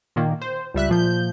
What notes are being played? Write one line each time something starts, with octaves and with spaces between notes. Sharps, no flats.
A#2 D#3 A#3
C5
C#2 G3 E5 F#6
A#2 F3 G6